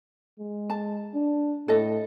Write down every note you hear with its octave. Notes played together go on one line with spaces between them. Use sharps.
G#3
A5
D4
A2 A4 D#5